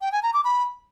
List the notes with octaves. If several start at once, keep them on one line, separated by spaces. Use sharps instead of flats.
G5
G#5
A#5
D6
B5